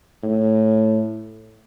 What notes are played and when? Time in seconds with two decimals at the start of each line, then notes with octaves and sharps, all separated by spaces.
0.23 A2